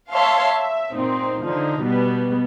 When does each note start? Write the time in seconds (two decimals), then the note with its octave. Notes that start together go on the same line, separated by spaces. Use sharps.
0.11 C#5 E5 F5 A5 C6
0.46 E5
0.94 A#2 C4 D#4
1.43 D3 F3 D#4
1.82 B2 G3 B3